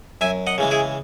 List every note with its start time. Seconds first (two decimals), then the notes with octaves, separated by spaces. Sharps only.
0.21 F#2 E5 G#5
0.47 D#5 F#5
0.58 C#3 E3 G#3
0.71 E4 G#4